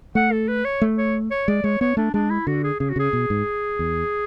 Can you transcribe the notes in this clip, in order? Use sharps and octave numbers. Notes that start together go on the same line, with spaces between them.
A3 F#5
A4
B4
C#5
A3
C#5
C#5
G#3 D5
G#3 C#5
B3 C#5
A3 D4
G#3 D4
E4
D3 F#4
G#4
C#3 G#4
F#4
C#3 G#4
B2
G#2
E2